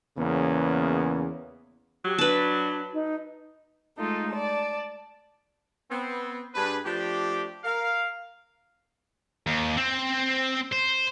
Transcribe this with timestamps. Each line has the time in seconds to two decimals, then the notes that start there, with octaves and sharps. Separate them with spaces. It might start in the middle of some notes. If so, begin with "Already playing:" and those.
0.18 E2 C#3 A#3 B3 C#4
2.05 F#3 G4
2.18 D4 B4 A5
2.93 D#4
3.98 G#3 A3 D#4 F4 A4
4.30 D5 A5
5.90 B3 C4
6.54 G2 D4 G#4 B4
6.85 F3 A3 D4 G4
7.64 A#4 F5
9.46 D#2
9.77 C4
10.72 C5